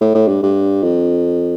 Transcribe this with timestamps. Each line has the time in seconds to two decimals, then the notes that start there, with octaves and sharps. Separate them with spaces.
0.01 A2
0.14 A2
0.28 G2
0.43 G2
0.83 F2